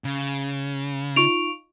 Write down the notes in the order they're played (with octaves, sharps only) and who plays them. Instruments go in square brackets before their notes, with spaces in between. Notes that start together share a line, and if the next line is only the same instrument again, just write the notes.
[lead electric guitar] C#3
[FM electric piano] D#4 F4 [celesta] C#6 D7 F7